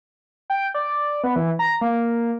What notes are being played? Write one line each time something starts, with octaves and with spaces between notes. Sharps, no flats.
G5
D5
B3
E3
A#5
A#3